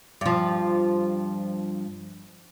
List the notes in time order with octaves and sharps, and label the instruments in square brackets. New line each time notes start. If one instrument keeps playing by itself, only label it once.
[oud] G2 F3